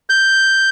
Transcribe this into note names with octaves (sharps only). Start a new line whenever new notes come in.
G6